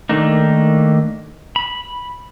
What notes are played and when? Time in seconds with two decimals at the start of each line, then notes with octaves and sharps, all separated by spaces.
0.09 D#3 A3 A#3 D4 D#4
1.56 B5